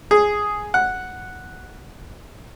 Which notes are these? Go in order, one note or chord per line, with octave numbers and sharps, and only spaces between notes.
G#4
F#5